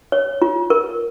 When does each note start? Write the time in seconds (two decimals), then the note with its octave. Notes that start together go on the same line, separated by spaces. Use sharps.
0.12 C#5
0.42 F4
0.70 A#4